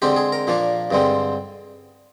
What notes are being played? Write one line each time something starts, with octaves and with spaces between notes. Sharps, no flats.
D3 G#3 C4 G4
G#4
A#4
A#2 F3 A#3 D4
G2 D3 G#3 C4